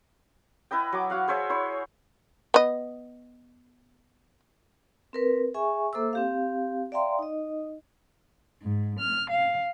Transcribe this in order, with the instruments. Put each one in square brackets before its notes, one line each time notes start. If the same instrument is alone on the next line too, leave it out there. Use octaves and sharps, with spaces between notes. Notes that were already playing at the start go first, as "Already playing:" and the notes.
[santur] E4 B4 D#5 G5
F#3 D6
F#4 F5 F#5
G#4 C5 C#5 E5
E4 C5 C#5
[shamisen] B3 D#5
[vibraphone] C4 A#4 B4
G#4 E5 G#5 C#6
A#3 A4 C5 E5 D6 E6
C4 G4 F5
D5 E5 F5 G5 A#5 C6
D#4 D#5
[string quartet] G#2
F6
F5